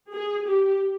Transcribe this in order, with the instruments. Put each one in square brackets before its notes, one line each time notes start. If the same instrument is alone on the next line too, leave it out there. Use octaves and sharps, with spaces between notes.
[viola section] G#4
G4